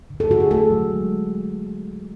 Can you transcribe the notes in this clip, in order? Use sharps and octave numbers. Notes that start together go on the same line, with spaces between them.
D3
A4
D3 F#4
G#4
A3 A4
F#3
G#3